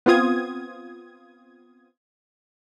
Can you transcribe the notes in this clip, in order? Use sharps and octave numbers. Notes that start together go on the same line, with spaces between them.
B3 C4 F4 D#6 G#6